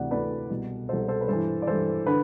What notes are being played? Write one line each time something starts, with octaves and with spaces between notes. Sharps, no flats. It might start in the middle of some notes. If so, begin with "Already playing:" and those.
Already playing: D2 C3 E3 D5 F#5
D2 C3 E3 B4 D5
C2 B2
C2 B2 A4 C5
A4 C5
B4
G2 E3 A4 C5
D5
G2 E3 A4 C5
D3 B4